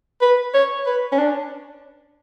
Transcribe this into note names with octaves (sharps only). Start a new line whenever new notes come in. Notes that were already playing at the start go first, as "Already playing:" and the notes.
B4
C#5
B4
C#4
D4